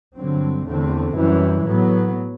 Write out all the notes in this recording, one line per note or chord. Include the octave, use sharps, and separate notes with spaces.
G2 D3 F#3 C4
E2 D3 A3 C4
F#2 E3 G3
A2 F#3 B3